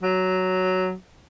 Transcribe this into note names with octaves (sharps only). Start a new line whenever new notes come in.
F#3